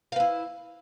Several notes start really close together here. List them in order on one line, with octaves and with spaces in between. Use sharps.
F5 B4 E4